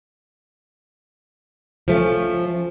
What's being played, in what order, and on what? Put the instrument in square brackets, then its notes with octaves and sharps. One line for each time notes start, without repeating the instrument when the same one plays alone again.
[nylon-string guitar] F3 A3 C#4